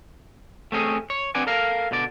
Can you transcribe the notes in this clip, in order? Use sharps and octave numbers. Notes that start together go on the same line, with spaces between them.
A3 C4 C#4 G#4
C#5
C4 D4 B4 D5 F#5 G#5
A4 A#4 F5
B2 D3 D5